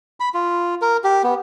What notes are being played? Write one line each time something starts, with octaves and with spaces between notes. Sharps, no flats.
B5
F4
A#4
G4
B3